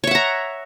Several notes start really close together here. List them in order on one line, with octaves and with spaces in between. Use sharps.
C#5 E5 F#5 A#5